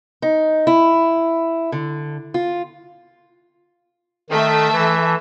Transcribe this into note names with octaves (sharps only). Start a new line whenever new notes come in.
D#4
E4
D3
F4
D#3 A3 E5
E3